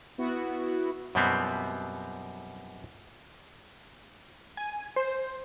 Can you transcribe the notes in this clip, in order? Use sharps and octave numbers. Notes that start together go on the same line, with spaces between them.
B3 E4 F#4
F#2 B2 F3 G3 B3 C4
G#5
C5